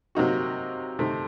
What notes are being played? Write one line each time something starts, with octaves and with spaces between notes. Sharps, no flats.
C3 F#3 A#3 D#4 F#4
C3 D#3 A3